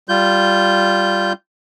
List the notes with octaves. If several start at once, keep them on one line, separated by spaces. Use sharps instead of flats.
G3 F4 G6